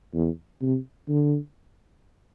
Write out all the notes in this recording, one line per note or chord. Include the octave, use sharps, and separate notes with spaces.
E2
C3
D3